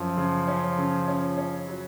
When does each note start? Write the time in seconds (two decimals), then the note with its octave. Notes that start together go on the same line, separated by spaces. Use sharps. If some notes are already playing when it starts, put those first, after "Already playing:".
Already playing: F#2 F3 C#4
0.17 C#3
0.48 C#4
0.78 C#3
1.08 C#4
1.38 C#4
1.68 F#3